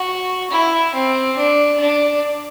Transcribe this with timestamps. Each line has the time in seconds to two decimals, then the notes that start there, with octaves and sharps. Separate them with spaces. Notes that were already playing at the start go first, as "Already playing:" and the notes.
Already playing: F#4
0.51 E4
0.94 C4
1.37 D4
1.80 D4